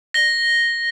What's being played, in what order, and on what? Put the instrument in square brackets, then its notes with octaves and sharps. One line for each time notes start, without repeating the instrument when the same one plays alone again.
[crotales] A#6 G7